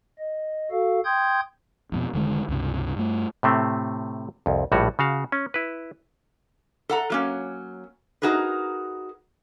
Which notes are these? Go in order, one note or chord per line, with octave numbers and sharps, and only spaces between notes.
D#5
F#4 A4 F5
G5 C6 D#6 G6 G#6
F2 G#2 B2
F1 D3 D#3 G#3
C#2 G2 C3
G2 A3
A2 C3 A3 C4
C2 F2
A#1 A2 G3 F#4 C#5
C#3 F#4 F5
C#4
E4 B4
A4 F#5 A#5
F#3 A#3 C#4
D#4 F#4 G#4 A#4 B4